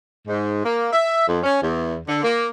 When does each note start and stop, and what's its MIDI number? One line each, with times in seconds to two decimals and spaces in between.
0.27 0.63 44
0.65 0.90 58
0.92 1.26 76
1.27 1.39 41
1.44 1.58 61
1.62 1.98 40
2.07 2.21 50
2.23 2.48 58